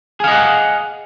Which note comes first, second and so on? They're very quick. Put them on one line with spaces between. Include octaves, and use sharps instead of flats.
G#4 F5 D#5 F#5